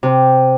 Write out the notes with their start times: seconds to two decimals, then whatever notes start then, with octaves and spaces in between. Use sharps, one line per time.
0.03 C3